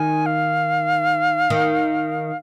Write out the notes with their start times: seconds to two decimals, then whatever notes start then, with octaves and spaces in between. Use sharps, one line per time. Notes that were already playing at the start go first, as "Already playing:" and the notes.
Already playing: D#3 G#5
0.26 F5
1.50 D#3